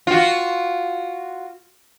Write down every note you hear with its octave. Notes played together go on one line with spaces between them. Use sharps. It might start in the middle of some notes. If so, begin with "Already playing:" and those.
F4 F#4